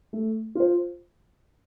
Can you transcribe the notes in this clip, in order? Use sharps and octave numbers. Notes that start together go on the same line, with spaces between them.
A3
F4 C5